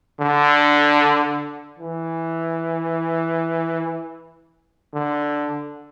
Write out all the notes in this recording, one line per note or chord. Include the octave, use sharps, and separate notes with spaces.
D3
E3
D3